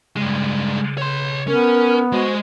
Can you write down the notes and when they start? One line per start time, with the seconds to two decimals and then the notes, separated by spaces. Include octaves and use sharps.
0.16 G2 C#3 G#3
0.98 C#5 C6
1.48 B3 C#4 A#4
2.12 G#3 F#4 C5 D#5